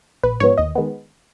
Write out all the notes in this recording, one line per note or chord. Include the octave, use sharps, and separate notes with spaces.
A#1 B4
G#2 F3 B3 C#5
D#2 D#5
D#3 G#3 B3